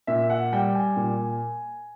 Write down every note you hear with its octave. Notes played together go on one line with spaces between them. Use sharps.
A#2 E5
F#5
G3 G5
G#5
A#2